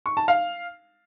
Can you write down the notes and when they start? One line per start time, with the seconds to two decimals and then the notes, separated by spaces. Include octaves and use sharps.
0.06 C#6
0.17 A5
0.28 F5